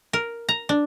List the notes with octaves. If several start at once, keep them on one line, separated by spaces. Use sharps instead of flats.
A#4
A#5
D4